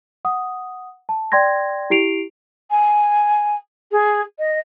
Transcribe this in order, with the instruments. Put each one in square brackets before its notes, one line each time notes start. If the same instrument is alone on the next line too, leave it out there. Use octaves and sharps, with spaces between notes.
[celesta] F#5 D#6
A5
D5 G5 C6 G#6 A#6
E4 G4 C7 D7 F7
[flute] G#5
G#4
D#5